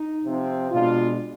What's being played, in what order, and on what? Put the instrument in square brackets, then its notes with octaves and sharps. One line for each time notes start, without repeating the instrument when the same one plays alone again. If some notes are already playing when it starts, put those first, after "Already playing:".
Already playing: [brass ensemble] D#4
C3 F3 C4
B2 G#3 B3 D4 F4